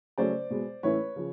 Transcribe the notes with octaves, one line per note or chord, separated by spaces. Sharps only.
C#3 F#3 A3 C#4 C5 D5
B2 G#3 B3
A2 E3 A3 C#4 E4 B4 C#5
C#3 F3